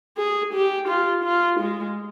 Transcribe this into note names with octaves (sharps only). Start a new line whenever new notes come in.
G#4
G4
F4
F4
G#3